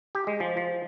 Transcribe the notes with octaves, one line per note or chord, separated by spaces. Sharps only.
G4
G#3
F3
F3